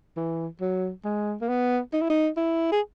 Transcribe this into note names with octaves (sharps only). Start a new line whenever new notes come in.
E3
F#3
G#3
A#3
B3
D#4
E4
D#4
E4
G#4